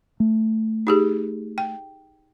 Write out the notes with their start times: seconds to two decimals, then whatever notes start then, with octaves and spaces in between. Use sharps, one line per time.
0.20 A3
0.87 D#4 G4 G#4
1.58 G5